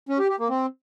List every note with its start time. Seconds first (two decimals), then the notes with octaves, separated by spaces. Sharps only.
0.09 C#4
0.19 G4
0.29 G4
0.39 A#3
0.49 C4